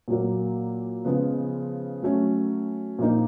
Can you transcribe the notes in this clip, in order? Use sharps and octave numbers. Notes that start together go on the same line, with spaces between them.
A#2 F#3 A#3
C#3 F3 G#3 B3
F#3 A3 C#4
A#2 F3 A#3 D#4